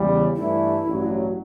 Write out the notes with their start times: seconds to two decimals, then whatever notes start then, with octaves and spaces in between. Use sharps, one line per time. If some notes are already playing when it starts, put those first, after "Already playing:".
Already playing: E2 C#3 G3
0.36 G2 E3 A3 D4 E4
0.86 A1 G2 F#3